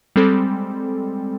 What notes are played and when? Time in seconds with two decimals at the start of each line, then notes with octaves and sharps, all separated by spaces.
0.16 G3 G#3 C4 A4